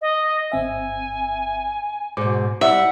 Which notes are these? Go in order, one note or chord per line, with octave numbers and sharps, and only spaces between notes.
D#5
G1 C4 E5 G#5
G#2 B2 D6
G3 E4 E5 F#5